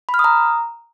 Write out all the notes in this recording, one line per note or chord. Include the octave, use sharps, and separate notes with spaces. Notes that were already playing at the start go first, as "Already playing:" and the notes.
B5
F6
D#6
A#5